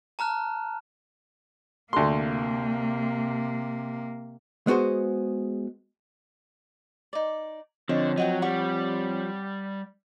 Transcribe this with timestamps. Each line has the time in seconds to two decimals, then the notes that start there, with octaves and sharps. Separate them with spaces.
0.19 A5 A#5 F6 F#6
1.93 D2 C3 A#3 C6
4.67 G#3 B3 F#4 G#4 C5
7.13 D#4 D5
7.89 D3 F3 C4 C#5 D#5
8.17 F#3 D#5 F#5 G5
8.42 G3 F#5 C#6